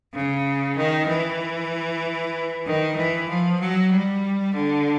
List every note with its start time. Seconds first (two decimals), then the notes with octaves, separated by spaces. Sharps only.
0.14 C#3
0.77 D#3
1.09 E3
2.66 D#3
2.96 E3
3.29 F3
3.59 F#3
3.92 G3
4.54 D3